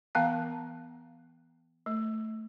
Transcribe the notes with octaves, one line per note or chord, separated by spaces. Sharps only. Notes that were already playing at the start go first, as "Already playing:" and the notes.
E3 B3 F5 G5 A5
A3